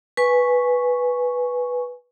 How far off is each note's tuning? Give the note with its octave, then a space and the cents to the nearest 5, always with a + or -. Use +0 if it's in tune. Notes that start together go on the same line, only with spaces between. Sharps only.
B4 -5 G#5 +0 C#6 +0